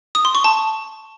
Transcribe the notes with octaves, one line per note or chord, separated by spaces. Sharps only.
D#6
C6
C#6
A5